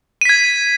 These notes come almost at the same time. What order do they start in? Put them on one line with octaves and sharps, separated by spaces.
D#7 B6 G#6